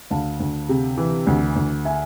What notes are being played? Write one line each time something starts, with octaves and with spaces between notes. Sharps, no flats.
D2 F5 A5
D2
C3
E3
D2
D2
E5 G#5